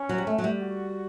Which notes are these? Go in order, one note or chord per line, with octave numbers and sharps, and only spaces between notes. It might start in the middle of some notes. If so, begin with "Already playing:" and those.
Already playing: C#4
F#3
G3
A3
F#3
G3
F#4